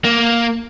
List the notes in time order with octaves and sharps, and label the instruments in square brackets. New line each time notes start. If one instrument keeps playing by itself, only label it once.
[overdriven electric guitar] A#3